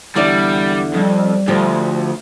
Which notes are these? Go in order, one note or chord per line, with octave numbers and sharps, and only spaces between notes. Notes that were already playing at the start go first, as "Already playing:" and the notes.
E2 D3 G3 D5
F2 G3
D2 F3 G4